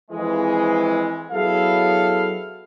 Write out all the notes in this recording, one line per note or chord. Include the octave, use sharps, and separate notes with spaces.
F2 E3 G#3
F#3 B3 E4 G#4 A4 F5